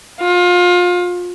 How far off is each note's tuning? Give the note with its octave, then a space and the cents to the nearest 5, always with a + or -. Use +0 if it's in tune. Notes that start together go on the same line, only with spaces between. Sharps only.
F4 +30